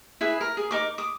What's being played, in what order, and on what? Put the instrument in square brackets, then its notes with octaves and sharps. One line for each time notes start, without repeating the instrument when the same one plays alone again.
[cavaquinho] E4 G#4 B4
A#4
G#4
D#4 A#4 D6
D6 D#6